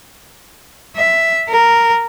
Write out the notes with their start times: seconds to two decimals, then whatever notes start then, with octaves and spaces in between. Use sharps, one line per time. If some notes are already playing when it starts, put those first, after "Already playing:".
0.96 E5
1.49 A#4